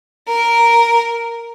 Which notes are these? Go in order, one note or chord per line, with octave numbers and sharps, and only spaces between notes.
A#4